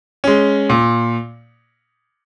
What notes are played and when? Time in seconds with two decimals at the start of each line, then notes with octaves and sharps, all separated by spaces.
0.24 G#3 C#4
0.70 A#2